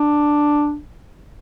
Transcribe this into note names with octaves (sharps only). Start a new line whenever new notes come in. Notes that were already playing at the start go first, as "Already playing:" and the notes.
Already playing: D4